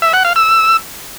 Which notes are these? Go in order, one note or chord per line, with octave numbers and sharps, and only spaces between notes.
E5
F#5
F5
E6